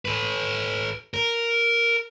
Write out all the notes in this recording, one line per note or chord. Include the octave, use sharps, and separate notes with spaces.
A4 B4
A#4